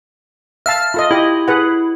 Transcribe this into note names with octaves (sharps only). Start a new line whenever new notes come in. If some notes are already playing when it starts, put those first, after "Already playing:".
E5 F5 A5 F6
F4 A4 D#5
E4 G4 D#5
G#4 B4 F#5